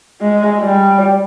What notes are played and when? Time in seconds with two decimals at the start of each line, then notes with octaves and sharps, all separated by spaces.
0.21 G#3
0.60 G3